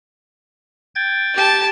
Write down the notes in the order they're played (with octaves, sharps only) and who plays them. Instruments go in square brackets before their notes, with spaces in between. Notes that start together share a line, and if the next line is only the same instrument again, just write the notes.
[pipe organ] G5 G#6 A6
[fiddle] G4 A5